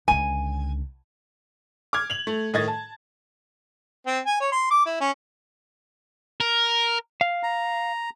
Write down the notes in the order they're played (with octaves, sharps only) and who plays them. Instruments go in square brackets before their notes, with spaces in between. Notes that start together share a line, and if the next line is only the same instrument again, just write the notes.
[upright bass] C#2 D3 [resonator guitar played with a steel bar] G#5
[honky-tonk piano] D6 F6 G#6
F7 F#7
A3
A2 D#3 D#5 G#6 A6
A5
[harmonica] C4
G#5
C#5
C6
D6
E4
C#4
[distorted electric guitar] A#4
[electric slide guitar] F5
[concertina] A#5